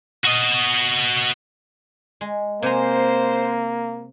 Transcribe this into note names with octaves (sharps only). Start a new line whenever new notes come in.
F#4 D#5
G#3
C3 A#3 C5 G#5 A#5